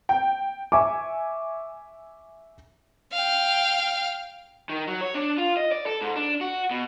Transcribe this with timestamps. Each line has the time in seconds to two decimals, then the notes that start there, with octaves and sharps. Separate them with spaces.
0.09 G5
0.72 E5 G#5 C#6 D6
3.13 F5 G5
4.69 D#3
4.87 F#3
5.01 C#5
5.14 D4
5.38 F4
5.57 D#5
5.72 D5
5.86 A4
6.01 G#2
6.16 D4
6.41 F#4
6.71 B2